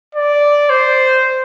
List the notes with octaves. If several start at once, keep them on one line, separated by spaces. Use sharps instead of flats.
D5
C5